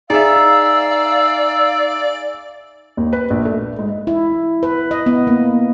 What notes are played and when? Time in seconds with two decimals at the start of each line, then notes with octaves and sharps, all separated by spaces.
0.10 D#4 G#4 D5 E5 F5 E6
2.97 D#2
3.13 B4
3.30 A#1
3.45 A3
3.79 G#2
4.07 E4
4.63 B4
4.91 D#5
5.06 B3
5.27 A#3